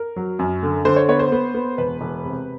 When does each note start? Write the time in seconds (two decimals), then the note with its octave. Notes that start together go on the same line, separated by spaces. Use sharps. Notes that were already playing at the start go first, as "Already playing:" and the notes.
Already playing: A#4
0.16 F#3
0.39 F#2
0.62 D3
0.85 D3 C5
0.96 C#5
1.08 B3 C#5
1.19 C5
1.32 B3
1.54 B3
1.78 E1 B4
2.01 E1
2.25 C3